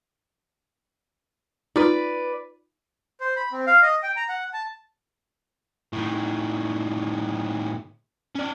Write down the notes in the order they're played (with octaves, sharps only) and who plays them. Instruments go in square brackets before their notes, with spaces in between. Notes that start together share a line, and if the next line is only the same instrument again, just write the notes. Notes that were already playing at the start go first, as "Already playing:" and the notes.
[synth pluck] D#4 F4 [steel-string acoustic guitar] B4 D5
[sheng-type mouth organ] C5
B5
C4
F5
D#5
G5
A#5
F#5
A5
[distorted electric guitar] A2 D#3
C#4 D5